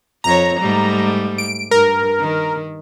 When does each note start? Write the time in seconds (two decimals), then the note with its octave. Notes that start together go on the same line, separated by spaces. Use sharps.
0.24 F2 C#5 A#5
0.60 G#2 G3 A3
1.38 D7
1.71 G2 A#4
2.19 D#3